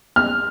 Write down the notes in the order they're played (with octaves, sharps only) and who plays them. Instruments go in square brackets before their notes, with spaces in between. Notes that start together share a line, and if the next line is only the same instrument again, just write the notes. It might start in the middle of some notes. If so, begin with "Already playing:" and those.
[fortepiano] F6